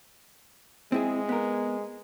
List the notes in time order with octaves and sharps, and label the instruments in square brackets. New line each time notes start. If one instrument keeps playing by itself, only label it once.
[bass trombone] G#3 [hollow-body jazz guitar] C4 E4 G#4
[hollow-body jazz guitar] B3 A#4